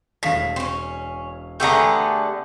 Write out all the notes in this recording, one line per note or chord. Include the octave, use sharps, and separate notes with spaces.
E1 A2 F5 B6
C4 C#4
D3 A3 B3 G4 G#4 A#5